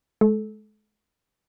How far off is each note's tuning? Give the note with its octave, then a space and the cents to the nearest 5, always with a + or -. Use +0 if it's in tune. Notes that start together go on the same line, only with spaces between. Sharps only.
G#3 +35 A4 -20